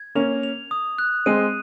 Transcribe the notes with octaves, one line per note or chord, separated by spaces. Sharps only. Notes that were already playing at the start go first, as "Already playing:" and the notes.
Already playing: G#6
A#3 C#4 F7
F7
D#6
F#6
G#3 C4 D#7